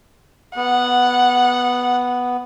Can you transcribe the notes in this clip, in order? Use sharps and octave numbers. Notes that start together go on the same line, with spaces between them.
B3 F#5